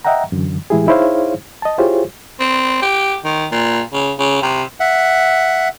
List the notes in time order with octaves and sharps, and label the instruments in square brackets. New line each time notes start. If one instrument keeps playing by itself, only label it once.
[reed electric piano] D#5 E5 F#5 G5 A#5
F#2 D3 E3
A2 E3 G#3 E4 G4 G#4
D#4 E4 G#4 C5 C#5 F5
D#5 A5
E4 F4 G4 G#4 C5 C#5
[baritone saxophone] C4
G4
D#3
A#2
C#3
C#3
C3
[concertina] E5 F#5